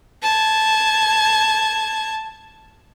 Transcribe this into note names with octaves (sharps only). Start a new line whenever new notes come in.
A5 G#6